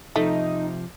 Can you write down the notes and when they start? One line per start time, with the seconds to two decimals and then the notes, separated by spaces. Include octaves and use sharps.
0.16 C3 F3 A3 D#4